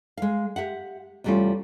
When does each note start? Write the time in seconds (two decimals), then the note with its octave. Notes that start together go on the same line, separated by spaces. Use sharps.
0.17 G#3 F5
0.56 G4 E5 F#5
1.24 E2 C3 G3 A3 C#4 F4